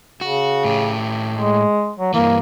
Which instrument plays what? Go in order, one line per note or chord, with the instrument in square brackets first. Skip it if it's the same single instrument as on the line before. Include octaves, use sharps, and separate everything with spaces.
[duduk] C#3 [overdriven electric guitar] F#4
[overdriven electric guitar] A2 G4
[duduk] G#3
F#3
[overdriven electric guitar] G2 E3 [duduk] A#3